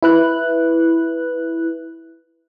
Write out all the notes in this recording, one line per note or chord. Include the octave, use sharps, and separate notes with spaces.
E4 B4 F#6